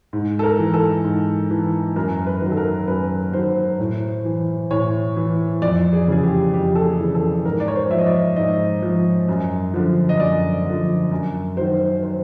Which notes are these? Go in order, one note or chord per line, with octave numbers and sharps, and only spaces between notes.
G#2
A4
A#4
E3
A4
G#2
E3
F#2 A#4
B4
D#3 F#3
A4
A#4
F#2 B4
D#3 F#3 C5
A2
E3
A2 C#5
E3
F2 D5
G#4
C#3 E3 G#4
G4
F2 G4
A4
G#4
C#3 E3
A4
G#2 A#4
D5
C#5
C5
F3 E5
D#5
D5
G#2 D#5
F3
F#2
D3 F3
D#5
F#2 D5
D3 F3
F#2
D#3 F#3 C5
C5